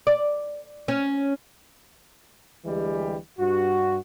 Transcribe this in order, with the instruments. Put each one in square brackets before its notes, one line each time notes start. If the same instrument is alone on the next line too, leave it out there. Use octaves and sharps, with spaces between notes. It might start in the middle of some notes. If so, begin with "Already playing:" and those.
[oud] D5
C#4
[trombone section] D2 E3 G3 G#3 G4
G2 F#4